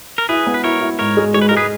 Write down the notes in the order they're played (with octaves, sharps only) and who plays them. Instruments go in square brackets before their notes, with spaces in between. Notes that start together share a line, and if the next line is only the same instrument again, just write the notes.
[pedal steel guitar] A#4
[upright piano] E4 [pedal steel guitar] G#4 B4
[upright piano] B3
[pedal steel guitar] B4
[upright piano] E4 [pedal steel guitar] A#4 C#5
[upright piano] E4
[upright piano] G#2 [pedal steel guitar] A#4 C#5
[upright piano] G#3
[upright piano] G#3 [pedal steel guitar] C#5
[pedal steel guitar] B4
[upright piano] G#3 [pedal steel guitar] A#4
[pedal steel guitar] G#4 B4